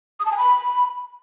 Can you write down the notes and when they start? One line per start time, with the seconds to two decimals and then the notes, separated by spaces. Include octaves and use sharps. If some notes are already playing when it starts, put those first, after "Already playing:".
0.20 D#6
0.26 A5
0.31 G#5
0.37 B5